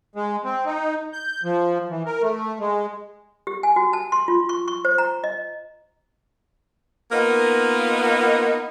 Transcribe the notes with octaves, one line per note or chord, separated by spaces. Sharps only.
G#3
C4
D#4
G6
F3
E3
A#4
A3
G#3
G4
G#5
F#4
A5
C6
F4
C#6
C#6
C5
A#5
D#5
A#3 B3 D#4 F4 A#4 B4